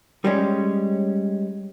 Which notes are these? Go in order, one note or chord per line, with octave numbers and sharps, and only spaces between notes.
G3 G#3 C#4